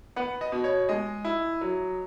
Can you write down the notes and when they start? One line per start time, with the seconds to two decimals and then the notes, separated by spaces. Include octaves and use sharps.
0.16 B3 F#5
0.41 D#5
0.52 B2
0.64 C#5
0.89 G#3 D#5
1.25 E4
1.61 F#3